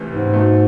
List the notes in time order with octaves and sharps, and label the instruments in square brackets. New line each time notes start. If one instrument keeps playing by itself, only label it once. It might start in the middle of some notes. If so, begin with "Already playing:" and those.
Already playing: [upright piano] C#2 C3 E3 A3 C#4
[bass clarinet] G#2
[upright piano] B2 F#3 A3